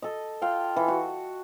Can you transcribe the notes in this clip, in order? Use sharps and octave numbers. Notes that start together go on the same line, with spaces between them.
A4 D#5
F4 F5 G5
E3
F#4